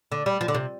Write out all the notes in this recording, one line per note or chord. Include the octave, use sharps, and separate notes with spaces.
D3
G3
F3
D3
C3